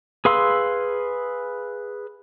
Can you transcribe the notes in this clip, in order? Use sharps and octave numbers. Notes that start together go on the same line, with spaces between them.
G#4 B4 F5 C6 E6